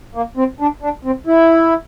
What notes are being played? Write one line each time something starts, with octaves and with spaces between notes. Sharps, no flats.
A#3
C4
D4
D4
C4
E4